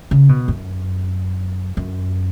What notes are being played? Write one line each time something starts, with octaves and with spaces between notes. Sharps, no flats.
C#3
B2
F#2
F#2